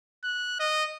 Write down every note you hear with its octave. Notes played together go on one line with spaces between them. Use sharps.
F#6
D#5